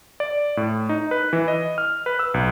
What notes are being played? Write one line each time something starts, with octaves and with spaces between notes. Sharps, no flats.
D5
A2
D#4
B4
E3
D#5
F6
B4
E6
B1